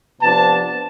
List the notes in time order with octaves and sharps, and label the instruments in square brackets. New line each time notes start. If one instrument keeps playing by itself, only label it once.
[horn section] C3 F3 B3 D4 A5